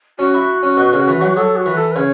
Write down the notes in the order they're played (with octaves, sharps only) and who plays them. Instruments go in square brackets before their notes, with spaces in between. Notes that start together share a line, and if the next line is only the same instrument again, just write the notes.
[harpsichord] C#4 [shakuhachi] F#4
[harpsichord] E4
C#4
B2
C#3
E3
F#3
[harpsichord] F#3 [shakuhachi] A4
[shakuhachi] F#4
[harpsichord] E3
[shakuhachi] A4
B4
[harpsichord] C#3 [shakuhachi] C#5